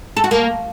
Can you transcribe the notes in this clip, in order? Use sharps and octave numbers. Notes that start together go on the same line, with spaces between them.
A4
F#4
A#3